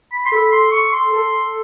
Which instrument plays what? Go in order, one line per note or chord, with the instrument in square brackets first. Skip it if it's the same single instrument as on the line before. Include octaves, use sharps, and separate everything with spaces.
[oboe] B5
C6
[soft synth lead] A4 [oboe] B5
[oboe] C6
C#6
C6
[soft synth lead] A4